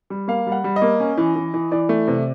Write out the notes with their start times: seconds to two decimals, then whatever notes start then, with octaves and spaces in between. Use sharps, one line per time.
0.10 G3
0.28 A#3 F5
0.47 G3
0.52 F#5
0.64 G3
0.76 D#5
0.82 A#3
1.00 C#4
1.18 E3
1.36 E3
1.54 E3
1.72 E3 D5
1.89 A3
2.08 C3